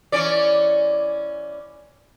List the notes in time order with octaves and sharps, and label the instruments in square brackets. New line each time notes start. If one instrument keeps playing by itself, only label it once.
[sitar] E3 C#4 D5